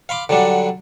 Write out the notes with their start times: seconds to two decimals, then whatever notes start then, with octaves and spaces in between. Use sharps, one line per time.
0.09 F5 B5 C6 D6
0.29 D3 F#3 G3 D4